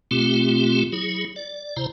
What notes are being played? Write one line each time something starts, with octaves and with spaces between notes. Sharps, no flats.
B2 A3 C4 F4 G4
F#3 E4 G#4
D5
C3 E4 C5 A#5